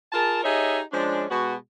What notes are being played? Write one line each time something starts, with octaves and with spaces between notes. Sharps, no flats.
F4 G#4 A#4 A5
D#4 G4 G#4 C#5 D#5 E5
F3 G#3 C#4 D4
B2 G#3 B3 F#4